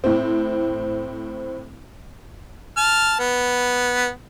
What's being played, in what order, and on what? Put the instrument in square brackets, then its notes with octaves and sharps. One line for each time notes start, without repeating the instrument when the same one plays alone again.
[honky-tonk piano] A2 C4
[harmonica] A5 F6
B3